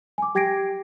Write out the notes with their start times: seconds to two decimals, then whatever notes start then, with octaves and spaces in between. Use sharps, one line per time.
0.18 G#5 D6
0.35 G4 G5 G#6 A#6 C7 D7